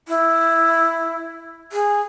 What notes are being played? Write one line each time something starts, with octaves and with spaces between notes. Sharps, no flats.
E4
G#4